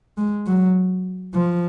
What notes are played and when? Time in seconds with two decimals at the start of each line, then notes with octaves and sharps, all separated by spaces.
0.17 G#3
0.46 F#3
1.34 F3